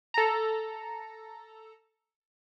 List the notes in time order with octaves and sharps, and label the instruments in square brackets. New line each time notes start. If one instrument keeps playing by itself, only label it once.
[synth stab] A4 A#5